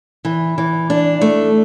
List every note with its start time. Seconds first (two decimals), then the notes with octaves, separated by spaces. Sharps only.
0.25 E3
0.58 E3
0.90 D4
1.21 A3